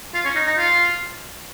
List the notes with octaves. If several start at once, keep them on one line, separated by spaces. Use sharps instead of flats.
F4
C#4
D#4
D#4
F4